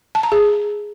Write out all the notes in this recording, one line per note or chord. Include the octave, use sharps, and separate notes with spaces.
A5
A#5
G#4